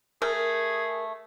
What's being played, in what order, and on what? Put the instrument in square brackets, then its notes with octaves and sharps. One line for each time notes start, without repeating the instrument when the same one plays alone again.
[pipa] A3 [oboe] G#4 [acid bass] A#4